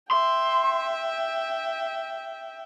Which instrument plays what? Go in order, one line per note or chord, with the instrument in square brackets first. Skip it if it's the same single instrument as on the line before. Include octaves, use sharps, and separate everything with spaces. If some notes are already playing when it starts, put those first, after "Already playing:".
[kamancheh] E5 G5 [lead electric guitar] C6